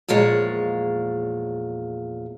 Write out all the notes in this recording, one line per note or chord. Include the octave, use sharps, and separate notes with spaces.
E2 A#2 F3 G#3 C#5